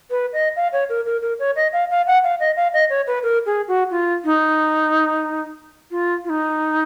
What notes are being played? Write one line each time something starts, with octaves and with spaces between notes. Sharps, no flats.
B4
D#5
F5
C#5
A#4
A#4
A#4
C#5
D#5
F5
F5
F#5
F5
D#5
F5
D#5
C#5
B4
A#4
G#4
F#4
F4
D#4
F4
F4
D#4